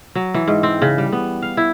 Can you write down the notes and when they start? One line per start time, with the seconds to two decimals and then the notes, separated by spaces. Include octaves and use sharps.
0.15 F#3
0.34 E3
0.48 G#2
0.63 C4
0.82 C#3
0.98 G3
1.13 B3
1.42 F5
1.57 E4